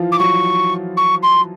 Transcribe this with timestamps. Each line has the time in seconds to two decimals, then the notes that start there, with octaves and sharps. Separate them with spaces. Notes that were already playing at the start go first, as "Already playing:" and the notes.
Already playing: E3 F3 E4 F4
0.12 D6
0.19 F#3 F#4 C#6
0.97 C#6
1.23 C6